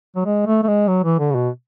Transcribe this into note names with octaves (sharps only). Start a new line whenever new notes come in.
F#3
G#3
A3
A3
G#3
F#3
E3
D3
C#3
B2